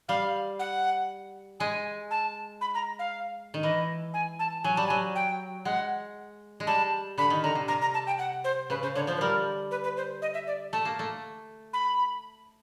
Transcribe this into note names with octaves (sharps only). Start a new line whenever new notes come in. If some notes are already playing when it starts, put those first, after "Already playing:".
G3 F5
F#5
G#3 G#5
A5
B5
A#5
F5
D#3
E3 D#5
G#5
A5
F#3 G#5
G3 A5
F#3 G#5
G5
G#3 F#5
G#3
G3 A5
D3 B5
D#3
D3 A#5
C3
C3 A#5
A#5
A5
G5
F#5
C5
C#3 B4
C#3 C5
D3 C#5
F3 C5
B4
G3 A#4
B4
B4
C5
D#5
E5
D5
A3 A5
A#3
A3
B5